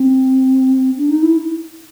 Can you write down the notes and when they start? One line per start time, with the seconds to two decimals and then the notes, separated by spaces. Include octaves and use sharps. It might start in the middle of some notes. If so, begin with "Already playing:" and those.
Already playing: C4
0.98 D4
1.10 D#4
1.22 E4